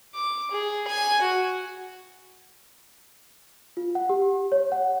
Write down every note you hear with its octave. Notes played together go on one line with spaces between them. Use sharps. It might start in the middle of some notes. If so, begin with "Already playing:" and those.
D6
G#4
G#5
F#4
F4
F#5
G4
C#5
F#5